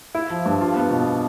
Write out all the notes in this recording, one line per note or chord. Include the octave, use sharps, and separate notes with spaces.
E4
F3
G2
F4
B3
B2